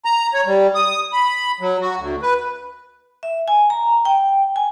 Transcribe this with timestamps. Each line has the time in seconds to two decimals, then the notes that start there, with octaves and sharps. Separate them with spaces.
0.05 A#5
0.34 C#5
0.46 G3
0.75 D#6
1.13 B5
1.61 F#3
1.82 F#4
1.97 D2
2.22 B4
3.23 E5
3.48 G#5
3.70 A#5
4.05 G5
4.56 G#5